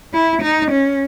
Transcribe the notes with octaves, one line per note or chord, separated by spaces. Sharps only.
E4
D#4
C#4